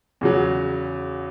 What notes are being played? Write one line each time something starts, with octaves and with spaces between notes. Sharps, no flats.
E2 C#3 F#3